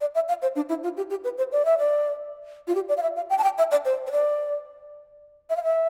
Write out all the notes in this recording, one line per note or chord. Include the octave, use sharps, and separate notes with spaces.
D5
E5
F5
C5
D4
E4
F4
G4
G4
B4
C5
D5
E5
D5
F4
G4
D5
F5
E5
F5
G5
A5
G5
E5
D5
C5
C5
D5
E5
F5
E5